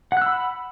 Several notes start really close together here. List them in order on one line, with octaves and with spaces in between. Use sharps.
F#5 F#6 E6 B5